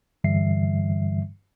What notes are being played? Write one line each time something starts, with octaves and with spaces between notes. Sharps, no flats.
G2 D3 E3 G3 E5 C7